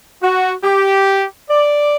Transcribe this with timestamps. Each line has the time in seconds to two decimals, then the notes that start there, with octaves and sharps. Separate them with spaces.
0.22 F#4
0.64 G4
1.49 D5